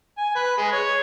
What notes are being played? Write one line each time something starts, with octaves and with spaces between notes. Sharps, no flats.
G#5
B4
G#3
C#5